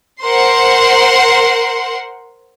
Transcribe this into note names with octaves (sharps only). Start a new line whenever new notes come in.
A#4 C5 F#5 C6